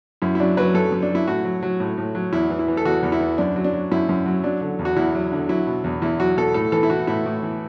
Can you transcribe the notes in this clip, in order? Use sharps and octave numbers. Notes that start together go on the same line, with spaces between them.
F#2 E4
E4
F#3 D4
F#3 B4
F#2 A4
F#2
D4
F#3
E4
A2 F#4
F#3
F#3
A2
A2
F#3
E2 E4
E3
E4
E3
A4
E2 F#4
E2
E4
E3
F#2 D4
F#3
D4
F#3
F#2 E4
F#2
F#3
F#3 D4
D3
E2
F#4
E2 E4
F#3
D3
F#3 E4
B2
E2
E2 E4
F#3 F#4
B2 A4
A2 A4
E3 A4
E4
E3 F#4
A2 E4
A2
E3